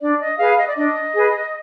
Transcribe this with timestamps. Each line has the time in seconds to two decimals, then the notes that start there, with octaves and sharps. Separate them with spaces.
0.01 D4 D5
0.19 D#5
0.38 G#4 B4 F5
0.58 D#5
0.67 D5
0.76 D4 D#5
1.14 G#4 B4